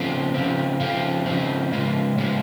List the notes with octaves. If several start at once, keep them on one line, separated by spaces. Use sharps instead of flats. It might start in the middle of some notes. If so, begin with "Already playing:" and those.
Already playing: C#3 F3 C4
C#3 F3 C4
C#3 F3 C4
C#3 F3 C4
C#3 F3 G#3
C#3 F3 G#3